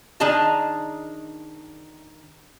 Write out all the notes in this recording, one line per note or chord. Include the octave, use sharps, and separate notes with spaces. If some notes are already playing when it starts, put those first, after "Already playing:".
D#3 D4 G#4 D#5 A5 A#5